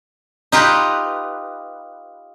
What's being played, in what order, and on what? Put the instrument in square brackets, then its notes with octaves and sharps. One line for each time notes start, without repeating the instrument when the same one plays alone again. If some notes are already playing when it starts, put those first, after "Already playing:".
[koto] D#4 F4 G4 B4